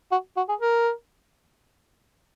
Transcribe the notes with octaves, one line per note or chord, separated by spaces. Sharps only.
F#4
F#4
G#4
A#4